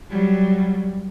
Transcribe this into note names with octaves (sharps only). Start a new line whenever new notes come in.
F#3 G3